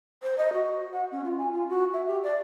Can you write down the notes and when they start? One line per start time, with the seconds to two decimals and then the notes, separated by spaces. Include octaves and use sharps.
0.23 C5
0.38 D#5
0.53 F#4
0.93 F#5
1.12 C#4
1.25 F4
1.38 G#5
1.52 F4
1.69 F#4
1.94 E5
2.07 G4
2.23 D5